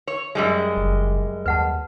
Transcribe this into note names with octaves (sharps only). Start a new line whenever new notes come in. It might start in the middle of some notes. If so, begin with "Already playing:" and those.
C#5
F#2 G3 G#3
F#1
D#2 B4 F#5 A5